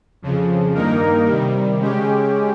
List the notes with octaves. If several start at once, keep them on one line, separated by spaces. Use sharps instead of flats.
F2 C#3 F3
G2 D#3 A#3 D#4 A#4
C3 D#3 G3
C#3 G#3 C#4 G4